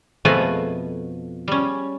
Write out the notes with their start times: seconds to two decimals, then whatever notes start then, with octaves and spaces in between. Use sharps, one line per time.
0.25 F2 B2 F3 A3 B4 G#5
1.48 G3 C#4